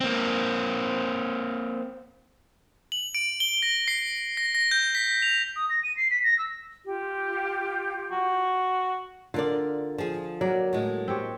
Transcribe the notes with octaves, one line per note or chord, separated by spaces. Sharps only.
A#3 C4
F#7
D7
G7
A#6
C7
A#6
A#6
G6
B6
F7
D#6
A#6
D#7
C7
B6
A#6
E6
F4 G4
F#4
D3 F4 A#4 D5
F3 G#4
F#3 A#3 D5
A2 G#3
C4 G4 C#5